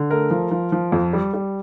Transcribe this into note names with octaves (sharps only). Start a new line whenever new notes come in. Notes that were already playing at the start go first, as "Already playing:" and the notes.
Already playing: D3
A3 A#4
F3
F3
F3
F2
G3
G3